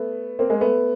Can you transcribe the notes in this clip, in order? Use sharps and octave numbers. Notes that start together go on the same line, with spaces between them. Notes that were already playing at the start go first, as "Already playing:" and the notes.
Already playing: A3 B3
A#3 C4
G#3 A#3
A3 B3